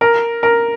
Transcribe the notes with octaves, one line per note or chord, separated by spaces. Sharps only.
A#4
A#4